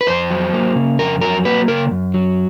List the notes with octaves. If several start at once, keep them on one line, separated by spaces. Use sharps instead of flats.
B4
F2 C5
F#3
A#3
C#3
F2 A#4
F#3 A#4
A#3 B4
C#3 A#4
F#2
F#3